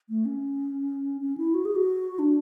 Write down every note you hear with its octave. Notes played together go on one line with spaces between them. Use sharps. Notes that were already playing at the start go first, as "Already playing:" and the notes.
A3
C#4
C#4
E4
F#4
G#4
F#4
D4